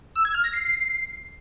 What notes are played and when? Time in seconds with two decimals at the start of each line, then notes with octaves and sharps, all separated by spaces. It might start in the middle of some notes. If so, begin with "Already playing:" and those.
0.16 E6
0.25 G#6
0.34 F6
0.44 A#6
0.53 C7